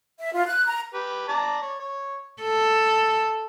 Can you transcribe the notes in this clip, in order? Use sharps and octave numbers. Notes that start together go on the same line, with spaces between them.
E5
F4
F#6
A#5
G4 B4
D5 A5 A#5
C#5
C#5
A4